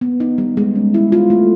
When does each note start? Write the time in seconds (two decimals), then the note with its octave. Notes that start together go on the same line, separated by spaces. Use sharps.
0.01 B3
0.20 D#4
0.38 G3
0.57 G#3
0.75 C#4
0.94 E4
1.12 F4
1.30 A3